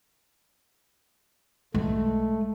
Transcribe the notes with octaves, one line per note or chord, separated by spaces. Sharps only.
B1 G#3 A3